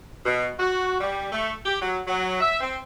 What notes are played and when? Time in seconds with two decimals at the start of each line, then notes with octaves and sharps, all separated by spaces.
0.25 B2
0.60 F#4
1.01 G3
1.32 A3
1.66 G4
1.81 F#3
2.07 F#3
2.41 E5
2.61 C4